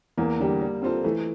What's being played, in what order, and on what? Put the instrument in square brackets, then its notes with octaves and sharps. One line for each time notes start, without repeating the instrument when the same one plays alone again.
[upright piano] E2 [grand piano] A#3
[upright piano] D3 G3 D4 G4
G3
C4 F4 A4 C5
[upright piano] E3 [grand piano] A3